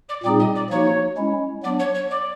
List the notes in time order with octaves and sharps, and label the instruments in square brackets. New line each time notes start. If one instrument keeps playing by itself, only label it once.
[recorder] D5
[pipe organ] A#2 G3 C4 D#4 G#4 [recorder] D5
[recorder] D#5
D5
[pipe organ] F3 A#3 D#4 F#4 [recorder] C#5
[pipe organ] G#3 C#4 E4
[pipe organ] F#3 B3 D4 [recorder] D5
[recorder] C#5
C#5
D5